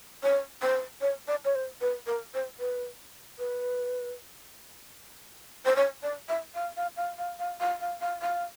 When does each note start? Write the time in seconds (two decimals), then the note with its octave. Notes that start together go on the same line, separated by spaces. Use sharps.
0.23 C#5
0.62 C5
1.01 C#5
1.28 D5
1.45 C#5
1.55 C5
1.81 B4
2.07 A#4
2.34 C5
2.59 B4
3.39 B4
5.65 C5
5.76 C#5
6.03 D5
6.29 E5
6.55 F5
6.77 F5
6.97 F5
7.18 F5
7.39 F5
7.60 F5
7.81 F5
8.01 F5
8.22 F5